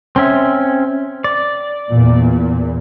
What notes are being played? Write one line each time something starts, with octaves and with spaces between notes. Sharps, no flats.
C4 C#4 E5
D5
E2 A#2